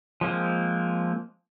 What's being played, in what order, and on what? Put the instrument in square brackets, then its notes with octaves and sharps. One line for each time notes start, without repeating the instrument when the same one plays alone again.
[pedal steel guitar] F3 G#3 A#3 C4